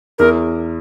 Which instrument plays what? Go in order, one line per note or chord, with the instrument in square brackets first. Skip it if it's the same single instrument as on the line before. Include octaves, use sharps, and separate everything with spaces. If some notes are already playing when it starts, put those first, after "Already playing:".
[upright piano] E2 [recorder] A#4